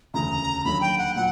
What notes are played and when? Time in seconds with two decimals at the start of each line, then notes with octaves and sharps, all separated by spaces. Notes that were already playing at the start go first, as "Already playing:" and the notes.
0.14 E1 D2 C#3 A#5
0.65 D#2 D3 F#3 A#3 B5
0.81 G5
0.98 F#5
1.16 A#2 F#3 F#5